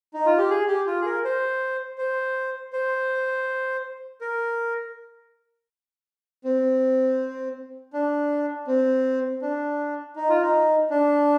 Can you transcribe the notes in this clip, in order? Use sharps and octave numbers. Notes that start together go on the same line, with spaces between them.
D#4
F4
G4
G#4
G4
F4
G#4
A#4
C5
C5
C5
A#4
C4
D4
C4
D4
D#4
F4
D#4
D4